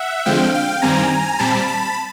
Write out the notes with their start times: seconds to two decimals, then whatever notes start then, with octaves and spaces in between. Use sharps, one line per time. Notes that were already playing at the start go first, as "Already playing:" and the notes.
Already playing: E5 F#5
0.25 D3 F3 G#3 C4 F5 G5
0.54 F5 G5
0.82 G2 D#3 G3 C4 G#5 A#5
1.39 A#2 G3 C4 A5 B5
1.67 A5 B5